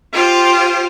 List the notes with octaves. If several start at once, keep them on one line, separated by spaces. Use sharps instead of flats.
F4 G4 C5